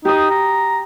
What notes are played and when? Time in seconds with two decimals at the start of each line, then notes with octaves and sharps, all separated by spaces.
0.05 D#4 G4 D#6
0.30 A#5